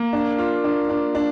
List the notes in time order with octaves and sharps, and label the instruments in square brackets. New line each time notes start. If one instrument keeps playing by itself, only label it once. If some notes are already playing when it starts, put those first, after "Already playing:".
Already playing: [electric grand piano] A#3
[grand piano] D4
F4
D4
D4
D4